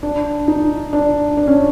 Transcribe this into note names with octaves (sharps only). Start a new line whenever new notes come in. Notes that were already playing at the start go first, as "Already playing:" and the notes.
D4
D#4
D4
D4
C#4